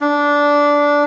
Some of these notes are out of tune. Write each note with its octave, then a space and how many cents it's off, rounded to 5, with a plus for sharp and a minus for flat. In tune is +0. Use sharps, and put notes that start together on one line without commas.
D4 -15